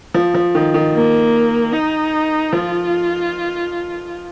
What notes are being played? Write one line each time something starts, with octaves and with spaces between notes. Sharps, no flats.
F3
F3
D#3
D#3
A#3
D#4
F3 F4